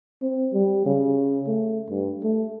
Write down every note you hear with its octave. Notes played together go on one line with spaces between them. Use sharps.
C4
G3
C#3
A3
G2
A3